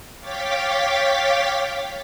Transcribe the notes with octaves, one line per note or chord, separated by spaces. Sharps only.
C#5 F5 G5 D6 A6 B6